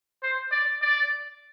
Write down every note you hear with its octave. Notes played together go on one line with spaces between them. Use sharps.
C5
D5
D5